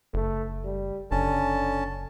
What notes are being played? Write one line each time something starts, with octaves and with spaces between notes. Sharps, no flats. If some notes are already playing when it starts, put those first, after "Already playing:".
F#1 A3
G3
F#1 D3 C#4 A5